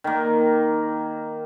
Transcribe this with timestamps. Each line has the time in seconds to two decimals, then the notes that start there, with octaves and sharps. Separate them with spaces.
0.04 D#3 A#3